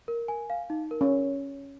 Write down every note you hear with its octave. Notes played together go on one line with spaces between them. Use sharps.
A#4
G#5
F5
D#4
A#4
C#4